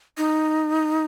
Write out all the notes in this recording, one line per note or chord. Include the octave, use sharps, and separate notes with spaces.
D#4